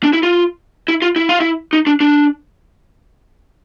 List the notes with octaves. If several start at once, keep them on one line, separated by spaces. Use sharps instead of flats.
D4
E4
F4
E4
F4
E4
F4
E4
D#4
D4
D4